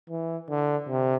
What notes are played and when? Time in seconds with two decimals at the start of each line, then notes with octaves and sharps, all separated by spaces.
0.10 E3
0.49 D3
0.89 C3